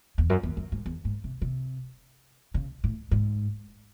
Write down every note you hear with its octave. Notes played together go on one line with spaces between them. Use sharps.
E2
F#2
E2
F#2
G#2
E2
G#2
C3
C3
C#3
A2
G#2